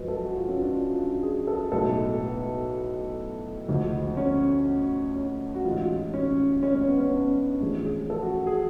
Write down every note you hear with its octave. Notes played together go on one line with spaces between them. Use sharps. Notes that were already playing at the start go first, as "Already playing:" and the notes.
Already playing: F#2 F3 G#3 B4
A4
F#4
F4
C#4
D4
F4
F4
G#4
A4
B1 A2 G#3 A4
B3
D2 D3 F3 G#3
C#4
C#4
F#4
A1 G#2 G#3 F4
C#4
C#4
C#4
B3
C#4
D4
A1 A2 F3 G#4
G#4
A4
F#4
G#4